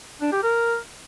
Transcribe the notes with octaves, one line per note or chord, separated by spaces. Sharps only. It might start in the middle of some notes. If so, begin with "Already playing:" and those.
D4
G4
A#4